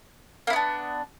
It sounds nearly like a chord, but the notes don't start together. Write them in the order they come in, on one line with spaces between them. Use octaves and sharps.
A#3 E4 B3 D4